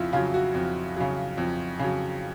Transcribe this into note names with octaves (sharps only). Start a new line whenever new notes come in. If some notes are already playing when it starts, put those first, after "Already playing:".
Already playing: F2 C#3 E4 F4
C#3 F#3 F4
F#4
F2
C#3 F#3
F2
C#3 F#3